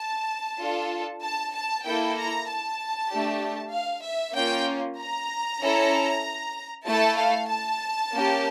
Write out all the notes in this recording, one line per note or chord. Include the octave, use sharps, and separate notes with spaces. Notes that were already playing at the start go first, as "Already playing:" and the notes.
Already playing: A5
D4 F4 A4
A5
A5
A#3 E4 A4 G5
A#5
A5
A3 D4 G4
F5
E5
A#3 C#4 F4 G5
A#5
C#4 E4 A4
A3 E4 A4 A5
F5
A5
A#3 C#4 G4